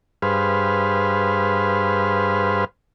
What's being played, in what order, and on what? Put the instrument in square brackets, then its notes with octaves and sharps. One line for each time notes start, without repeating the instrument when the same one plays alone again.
[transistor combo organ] G2 G#4 B4 C5 F5